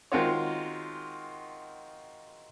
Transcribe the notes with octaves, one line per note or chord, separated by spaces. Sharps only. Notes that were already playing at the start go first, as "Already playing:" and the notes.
D#3 G#3 C4 F4 F#4 C#5